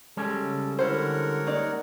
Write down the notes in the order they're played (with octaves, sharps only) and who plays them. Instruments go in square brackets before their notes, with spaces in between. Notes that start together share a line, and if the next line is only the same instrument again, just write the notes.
[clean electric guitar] G3 G#3 C#4 [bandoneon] A4
[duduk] C#3
[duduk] D3 [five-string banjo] E4 C5 [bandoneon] A#4 C#5 F#5
[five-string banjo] A#3 D#4 D5